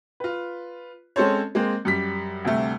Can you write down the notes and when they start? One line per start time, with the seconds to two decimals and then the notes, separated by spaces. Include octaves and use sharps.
0.20 F4 B4
1.16 G#3 C4 C#4 A4 C5 C#5
1.55 G#3 A#3 C4
1.85 F#2 G3 B6
2.45 D2 C3 G3 A3